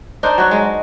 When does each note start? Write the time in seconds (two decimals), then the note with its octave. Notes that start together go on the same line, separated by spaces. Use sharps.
0.23 D4 D#4 A#4 C5
0.38 F#3 F#4
0.51 G#3